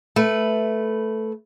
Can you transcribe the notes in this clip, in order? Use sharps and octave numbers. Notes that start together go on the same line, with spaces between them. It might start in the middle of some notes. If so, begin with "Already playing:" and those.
A3 B4